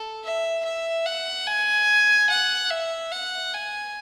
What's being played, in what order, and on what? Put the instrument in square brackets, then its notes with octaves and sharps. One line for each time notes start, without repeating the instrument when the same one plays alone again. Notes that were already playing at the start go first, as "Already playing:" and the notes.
Already playing: [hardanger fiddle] A4
E5
E5
F#5
G#5
F#5
E5
F#5
G#5